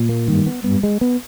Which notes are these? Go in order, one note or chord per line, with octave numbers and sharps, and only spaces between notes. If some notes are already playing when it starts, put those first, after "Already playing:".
Already playing: A#2
A#3
G2 D#3
B3
G2 B3
G#3
B3